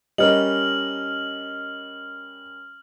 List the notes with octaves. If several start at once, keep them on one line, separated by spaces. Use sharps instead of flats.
G3 C#4 A#4 D#5 F6 F#7